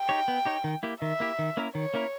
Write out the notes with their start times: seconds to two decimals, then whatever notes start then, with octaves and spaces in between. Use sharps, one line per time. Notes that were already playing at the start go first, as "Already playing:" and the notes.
Already playing: G5
0.09 D#4 G4 C#5
0.28 B3
0.45 D#4 G4 C#5
0.64 D#3
0.83 A#3 E4 G4
1.02 D#3 E5
1.20 A#3 E4 G4
1.39 D#3
1.57 A#3 C#4 E4 A#4
1.75 D#3 C#5
1.94 A#3 C#4 E4 A#4